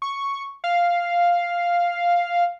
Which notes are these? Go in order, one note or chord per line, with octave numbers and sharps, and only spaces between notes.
C#6
F5